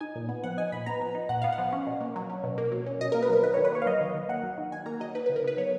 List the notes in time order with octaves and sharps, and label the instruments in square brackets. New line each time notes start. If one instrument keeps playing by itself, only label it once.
[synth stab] D#4 G#5
A#2
B3
F3 F#5
D#4 G#5
A#2 B5
B3 A#5
F3
D#4
A#2 F#5
B3 F5
F#5
F3
C#4
B2
A#3
F#3
C#4
B2
A#3
F#3
C#4
B2 D#5
A#3 A#4
B4
F#3 A#4
D#3 B4
C#5
D#3
B4
A#3 C#5
F5
F#3 D#5
D#3
D#3
A#3 F#5
F#3
D#3
D#3 G#5
A#3 A#5
F#3 D#5
D#4 B4
B4
C#3
A#4
B3 B4
F#3 C#5